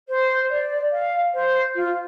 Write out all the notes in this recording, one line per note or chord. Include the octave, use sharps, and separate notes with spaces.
C5
D5
F5
C5
F4